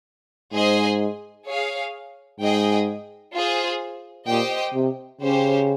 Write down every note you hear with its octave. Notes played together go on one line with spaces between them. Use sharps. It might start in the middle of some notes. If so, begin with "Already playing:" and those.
G#2 G#4 C5 D#5 G#5
G#4 C#5 F5
G#2 G#4 D#5 G5
F4 G#4 C5
A#2 G4 C5 D#5 G5
C3
C#3 C#4 G4 C5